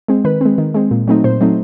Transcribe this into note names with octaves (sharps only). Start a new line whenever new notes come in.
G#3 C4
D#3 B4
G#3 C4
D#3
G#3 C4
A#2
F#3 A3 C4 D#4
A#2 C5
F#3 A3 C4 D#4